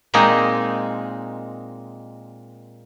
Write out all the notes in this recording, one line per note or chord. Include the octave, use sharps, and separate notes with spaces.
A#2 G#3 A#3 C4 D#4